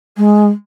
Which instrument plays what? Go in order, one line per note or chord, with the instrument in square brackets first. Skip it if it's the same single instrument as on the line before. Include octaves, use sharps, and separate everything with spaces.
[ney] G#3